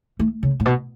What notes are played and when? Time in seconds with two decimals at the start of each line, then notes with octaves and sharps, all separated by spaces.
0.19 A3
0.43 C#3
0.60 A2
0.65 B2